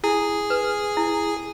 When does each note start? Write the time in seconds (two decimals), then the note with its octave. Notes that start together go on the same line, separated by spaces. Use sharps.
0.04 E4 G#4
0.50 B4
0.97 E4